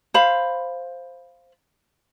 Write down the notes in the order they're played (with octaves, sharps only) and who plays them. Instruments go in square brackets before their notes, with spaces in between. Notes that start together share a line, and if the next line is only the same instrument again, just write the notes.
[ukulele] C5 F5 B5